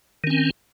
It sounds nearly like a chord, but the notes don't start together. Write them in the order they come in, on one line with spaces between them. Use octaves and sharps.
D#3 C#4 C4